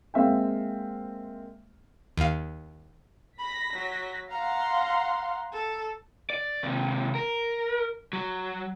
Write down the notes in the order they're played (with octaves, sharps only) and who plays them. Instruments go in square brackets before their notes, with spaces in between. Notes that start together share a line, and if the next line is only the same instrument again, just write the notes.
[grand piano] G#3 A#3 C4 E5 F5 G5
[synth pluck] D#2 F5
[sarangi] B5 [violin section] A#6 B6
[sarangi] F#3
[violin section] F5 F#5 C6 [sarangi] A#5
[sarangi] A4
[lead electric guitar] D5
D#2 C3
A#4
F#3